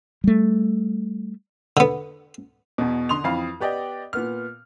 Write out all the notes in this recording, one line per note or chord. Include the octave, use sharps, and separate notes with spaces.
G3 A3
D3 B3
E2 B2
D3 C6 D#6 F7
F2 E3 F5 B5
B3 G4 D5 D#5 G5
A#2 B3 F6